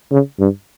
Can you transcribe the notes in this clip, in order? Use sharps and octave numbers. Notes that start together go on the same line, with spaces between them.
C#3
G2